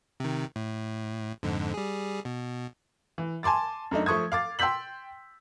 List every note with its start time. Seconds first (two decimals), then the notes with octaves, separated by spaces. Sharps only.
0.20 C3 D#3
0.56 A2
1.43 F2 G#2 D3
1.74 G3 G#4
2.25 B2
3.18 E3
3.43 G#5 A5 C6 D6 A6
3.91 F#2 A3 D4 D#4
4.06 F3 A3 C#6 D#6 G#6
4.32 F5 D6 A6
4.59 G5 C6 E6 G6 B6 F#7